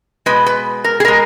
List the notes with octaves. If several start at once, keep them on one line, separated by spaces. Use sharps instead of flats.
B2 G#3 B4
B4
A#4
G#4
B2 G#3 A#4